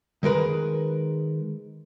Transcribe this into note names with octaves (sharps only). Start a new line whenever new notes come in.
D#3 G#3 A#4 B4